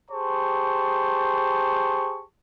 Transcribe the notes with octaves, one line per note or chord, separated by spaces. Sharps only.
G4 G#4 C5 A5 C#6